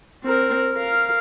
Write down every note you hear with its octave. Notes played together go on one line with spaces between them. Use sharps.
C4 A#4
A#4 F5